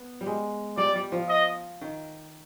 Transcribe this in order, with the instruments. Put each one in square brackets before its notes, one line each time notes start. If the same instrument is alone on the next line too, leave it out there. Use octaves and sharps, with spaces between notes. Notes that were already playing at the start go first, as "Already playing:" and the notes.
Already playing: [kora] B3
G3
G#3
[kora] G3 [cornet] D5
[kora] G3
F3
[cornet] D#5
[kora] D#3